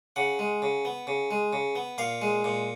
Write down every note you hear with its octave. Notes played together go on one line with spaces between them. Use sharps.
C#3 F#5
G#3
C#3
B3
C#3
G#3
C#3
B3
A#2 F5
G#3
A#2